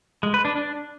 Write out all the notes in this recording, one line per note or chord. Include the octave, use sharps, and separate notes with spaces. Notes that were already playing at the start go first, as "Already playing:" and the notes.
G#3
B4
D4
D4